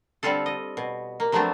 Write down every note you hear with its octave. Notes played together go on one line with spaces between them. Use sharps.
D3 G3 C4 F4 A4
D#5
B2
A#3
F3 F#3 A3 B3 C4 D4